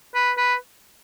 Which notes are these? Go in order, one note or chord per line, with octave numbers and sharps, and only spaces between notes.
B4
B4